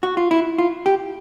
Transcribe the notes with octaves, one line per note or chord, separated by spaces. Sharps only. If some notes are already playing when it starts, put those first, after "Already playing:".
F#4
F4
E4
F4
G4